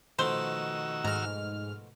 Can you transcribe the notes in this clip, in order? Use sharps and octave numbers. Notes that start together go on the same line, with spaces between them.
B2 D#3 F3 A3 F#4 C5 E6
G#2 A#5 F6